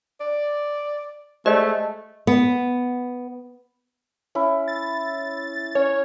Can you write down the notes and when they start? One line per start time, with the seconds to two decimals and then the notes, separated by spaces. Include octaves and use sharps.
0.20 D5
1.46 G#3 A3 G4 C5 D5 D#5
2.27 B3
4.35 C#4 E4
4.68 A6
5.75 C#4 C#5